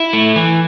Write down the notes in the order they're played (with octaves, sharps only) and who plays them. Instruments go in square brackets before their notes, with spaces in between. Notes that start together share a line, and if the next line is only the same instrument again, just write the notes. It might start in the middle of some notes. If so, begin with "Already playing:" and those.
Already playing: [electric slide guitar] E4
A3
E3